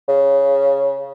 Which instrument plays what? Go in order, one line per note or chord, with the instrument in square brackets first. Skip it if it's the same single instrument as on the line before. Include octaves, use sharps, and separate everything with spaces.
[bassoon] C#3